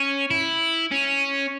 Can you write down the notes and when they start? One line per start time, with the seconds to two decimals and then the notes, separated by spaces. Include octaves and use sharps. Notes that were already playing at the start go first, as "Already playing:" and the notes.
Already playing: C#4
0.31 E4
0.92 C#4